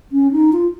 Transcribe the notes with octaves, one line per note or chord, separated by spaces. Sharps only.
C#4
D#4
F4